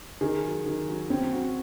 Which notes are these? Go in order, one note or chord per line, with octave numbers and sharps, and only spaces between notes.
D#3 G#4
F#3
D#3
F#3
C4 C#4
F#4